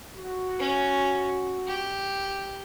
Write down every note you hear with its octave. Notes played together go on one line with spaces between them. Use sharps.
F#4
C#4
G4